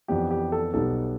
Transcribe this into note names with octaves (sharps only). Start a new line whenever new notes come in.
F2 E3 B3 D4 G4
G4
A4
B1 B2 G3 B3 A4